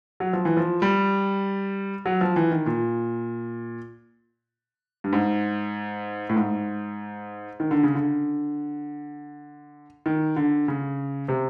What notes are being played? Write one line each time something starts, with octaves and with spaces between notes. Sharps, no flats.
F#3
F3
E3
F3
G3
F#3
F3
E3
D#3
A#2
G2
G#2
A2
G#2
D#3
D3
C#3
D3
D#3
D3
C#3
C3